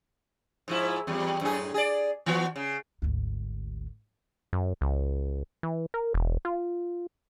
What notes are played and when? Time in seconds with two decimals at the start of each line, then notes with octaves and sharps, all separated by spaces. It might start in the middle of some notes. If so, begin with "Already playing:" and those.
0.68 G#2 F3 E4
1.07 E2 G3
1.41 F#2 A2 G#4
1.74 G#4 D5
2.26 E3 B3 F#4
2.56 C#3
3.02 G#1 D2
4.53 F#2
4.81 C#2
5.63 E3
5.94 A#4
6.14 E1
6.45 F4